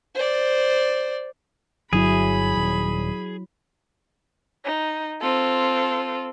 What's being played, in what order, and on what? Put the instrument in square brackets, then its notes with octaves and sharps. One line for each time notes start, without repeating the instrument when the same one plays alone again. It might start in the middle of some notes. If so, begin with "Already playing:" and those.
[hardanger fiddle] C5 D5
[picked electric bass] G1 [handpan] F#3 E4 [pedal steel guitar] G#4 [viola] B5
[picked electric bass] D#1
[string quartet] D#4
C4 F4 A4